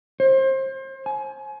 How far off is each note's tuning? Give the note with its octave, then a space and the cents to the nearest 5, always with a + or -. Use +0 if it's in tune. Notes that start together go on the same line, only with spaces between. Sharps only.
C5 +30
G#5 +30